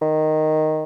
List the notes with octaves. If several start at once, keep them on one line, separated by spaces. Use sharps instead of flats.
D#3